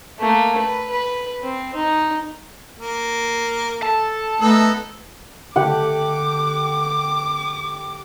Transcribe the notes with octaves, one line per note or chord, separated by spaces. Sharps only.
A3 A#3
B4
B4
C4
D#4
A#3
A4 A5
A3 B3 D#4 A4
D3 A3 G4 F#5 D6